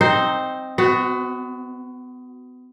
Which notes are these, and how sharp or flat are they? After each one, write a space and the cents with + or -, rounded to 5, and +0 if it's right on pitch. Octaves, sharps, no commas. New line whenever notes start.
C4 +0 D#4 +0 C5 +0
B3 +30 F#4 +0